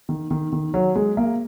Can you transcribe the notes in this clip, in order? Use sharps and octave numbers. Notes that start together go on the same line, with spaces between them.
D#3
D#3
D#3
F#3
G#3
A#3